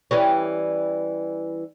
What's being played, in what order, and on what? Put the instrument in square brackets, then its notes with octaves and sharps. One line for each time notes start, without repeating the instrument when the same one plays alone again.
[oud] E3 G3 C#4